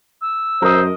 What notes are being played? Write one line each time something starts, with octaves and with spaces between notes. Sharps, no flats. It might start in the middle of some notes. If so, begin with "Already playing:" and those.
E6
F#2 A#4 C5 D#5